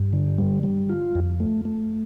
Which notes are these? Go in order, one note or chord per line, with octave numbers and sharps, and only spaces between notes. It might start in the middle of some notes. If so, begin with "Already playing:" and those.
Already playing: G2
D3
G3
G3
F4
F2
A3
A3